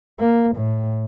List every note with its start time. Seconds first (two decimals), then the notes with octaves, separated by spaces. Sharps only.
0.20 A#3
0.56 A2